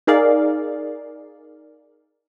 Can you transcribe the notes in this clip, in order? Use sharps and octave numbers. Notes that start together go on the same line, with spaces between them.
D#4 G#4 A#4 D5 F5